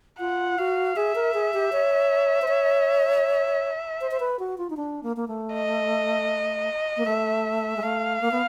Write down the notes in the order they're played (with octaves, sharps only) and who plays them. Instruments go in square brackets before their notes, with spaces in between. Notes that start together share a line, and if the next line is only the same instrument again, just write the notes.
[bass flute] F4 [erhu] F#5
[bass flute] F#4 [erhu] F5
[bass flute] G#4 [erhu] E5
[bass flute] A#4
G#4
G4
C#5
C5
C#5
C5
C5
B4
F#4
F4
D#4
D4
A#3
A#3
A3
[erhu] D#5
[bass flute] A#3
[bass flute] A3 [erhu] E5
[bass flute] G#3
[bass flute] A3 [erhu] F5
[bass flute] A#3
B3